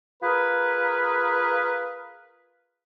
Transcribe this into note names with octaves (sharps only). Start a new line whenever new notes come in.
F4 G#4 A#4 B4